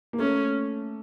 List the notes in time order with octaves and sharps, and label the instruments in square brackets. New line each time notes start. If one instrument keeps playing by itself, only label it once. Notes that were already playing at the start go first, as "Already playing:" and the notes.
[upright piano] A#3
[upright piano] A3 [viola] C#4